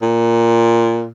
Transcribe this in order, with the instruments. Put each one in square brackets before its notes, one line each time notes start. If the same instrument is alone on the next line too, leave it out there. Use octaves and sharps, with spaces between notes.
[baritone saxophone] A#2